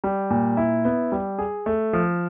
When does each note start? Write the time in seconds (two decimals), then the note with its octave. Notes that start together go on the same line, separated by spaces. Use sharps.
0.04 G3
0.30 A#2
0.57 E4
0.85 B3
1.12 G3
1.39 G#4
1.66 A3
1.93 F3